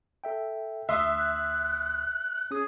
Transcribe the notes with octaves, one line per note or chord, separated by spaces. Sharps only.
A4 E5 G5
D2 E5 C6 D#6 F#6
C#4 G#4 D#6